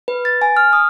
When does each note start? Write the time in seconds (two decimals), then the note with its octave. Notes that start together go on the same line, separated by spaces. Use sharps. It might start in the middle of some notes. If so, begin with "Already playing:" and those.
0.08 B4
0.25 A6
0.42 G#5
0.57 F6
0.73 D#6